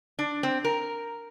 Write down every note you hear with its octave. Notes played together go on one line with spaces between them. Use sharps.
D4
C4
A#4